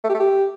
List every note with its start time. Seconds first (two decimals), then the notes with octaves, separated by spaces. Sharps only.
0.04 A3
0.09 G4
0.14 A3
0.20 G4